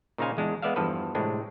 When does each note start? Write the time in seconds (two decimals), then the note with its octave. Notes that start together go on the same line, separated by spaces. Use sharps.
0.18 A#2 C#3 D#4 C5 F5 G#5
0.37 E2 G#3 D4
0.62 G#3 B3 D5 E5 F5
0.76 E2 G2 F3 A4 B4
1.15 A2 C3 G#3 C4 D4